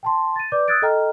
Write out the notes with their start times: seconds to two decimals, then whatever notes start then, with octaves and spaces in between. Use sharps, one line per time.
0.03 G5 A5 C6
0.36 A6 D#7
0.52 B4 D5 D6 G6
0.68 D#6 E6 F#6 G#6 A6 D7
0.82 A4 D#5 G5 A#5 F6